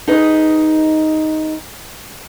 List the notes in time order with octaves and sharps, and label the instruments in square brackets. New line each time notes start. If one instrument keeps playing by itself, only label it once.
[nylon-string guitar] D#4 G#4 B4 D#5